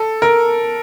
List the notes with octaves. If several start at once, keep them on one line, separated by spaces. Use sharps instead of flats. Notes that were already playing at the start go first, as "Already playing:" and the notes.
Already playing: A4
A#4